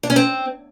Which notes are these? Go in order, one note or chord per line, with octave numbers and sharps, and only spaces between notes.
D4
C#4
C4